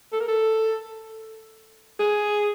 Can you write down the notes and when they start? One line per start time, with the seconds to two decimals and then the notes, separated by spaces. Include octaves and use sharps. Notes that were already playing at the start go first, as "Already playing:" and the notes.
0.12 A4
0.20 A#4
0.28 A4
1.99 G#4